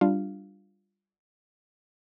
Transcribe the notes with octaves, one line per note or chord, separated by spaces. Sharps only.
G3 D4 F4 F5